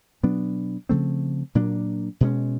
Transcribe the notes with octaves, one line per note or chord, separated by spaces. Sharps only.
B2 F#3 B3 D4
C#3 F3 A3 C4
A#2 F#3 A#3 D4
B2 G#3 C#4